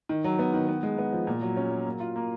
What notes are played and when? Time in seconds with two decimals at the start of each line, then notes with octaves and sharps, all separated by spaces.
0.09 D#3
0.24 F#3
0.39 B3
0.54 D#3
0.68 B3
0.83 G#3
0.98 B3
1.13 F3
1.27 A#2
1.42 F#3
1.57 C#4
1.71 F#3
1.86 A#3
2.00 F4
2.16 A#3